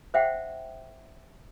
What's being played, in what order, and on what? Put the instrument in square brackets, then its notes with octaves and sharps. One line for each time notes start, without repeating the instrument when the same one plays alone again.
[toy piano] C5 E5 F#5 G5